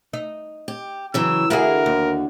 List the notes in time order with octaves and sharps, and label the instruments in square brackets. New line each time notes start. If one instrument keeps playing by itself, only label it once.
[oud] D#4
[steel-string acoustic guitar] G4
[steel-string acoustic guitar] C#3 E3 F#3 [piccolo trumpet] E6
[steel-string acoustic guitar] D3 F#4 F5 [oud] E4 G#4 [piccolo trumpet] A#4
[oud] D#2